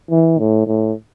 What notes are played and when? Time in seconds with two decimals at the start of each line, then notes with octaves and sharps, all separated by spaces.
0.11 E3
0.39 A2
0.67 A2